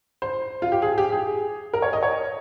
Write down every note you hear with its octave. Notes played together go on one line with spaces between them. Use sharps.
C5
F4
G4
G#4
G4
G#4
A#4
C#5
D#5
C#5